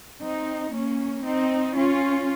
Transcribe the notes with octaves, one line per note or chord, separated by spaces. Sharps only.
C4 D#4
A#3 C#4
C4 D#4
C#4 F4